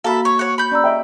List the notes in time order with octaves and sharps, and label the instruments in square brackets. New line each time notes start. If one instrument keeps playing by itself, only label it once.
[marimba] A#3 F#4 A#5 [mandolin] A4 E5 [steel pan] F5 B5
[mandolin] C#5
C#5 F#5
B5 G6
[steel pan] C#4 [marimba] D5 A#5 E6
[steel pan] D#5 E5 G5